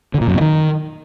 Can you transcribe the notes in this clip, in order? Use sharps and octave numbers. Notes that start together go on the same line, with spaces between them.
D3
A#2
F#2
B2
D#3